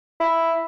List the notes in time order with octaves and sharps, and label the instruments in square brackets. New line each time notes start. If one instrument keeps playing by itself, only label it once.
[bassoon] E4